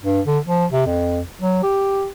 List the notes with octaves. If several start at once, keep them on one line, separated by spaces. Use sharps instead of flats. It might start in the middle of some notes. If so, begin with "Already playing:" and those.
G2
D3
F3
C3
F2
F#3
G4